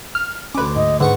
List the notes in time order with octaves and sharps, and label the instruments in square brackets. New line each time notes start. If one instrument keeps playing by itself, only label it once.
[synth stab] F6
[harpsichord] D2 D6 [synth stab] C#4 B4
[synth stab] G#2 [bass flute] D#5
[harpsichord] G#2 F#5 C#6 [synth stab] D3 [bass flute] B4